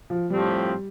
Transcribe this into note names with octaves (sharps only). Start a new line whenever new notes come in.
F3
A2 F3 G3 A3 C4 G4